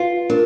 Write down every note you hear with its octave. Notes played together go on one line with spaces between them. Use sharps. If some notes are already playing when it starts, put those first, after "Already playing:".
Already playing: F4 B4
D4 A#4